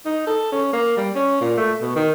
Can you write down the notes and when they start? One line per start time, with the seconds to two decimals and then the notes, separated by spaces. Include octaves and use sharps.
0.06 D#4
0.27 A4
0.52 C#4
0.73 A#3
0.97 G3
1.15 C#4
1.41 A#2
1.57 A3
1.81 B2
1.96 D#3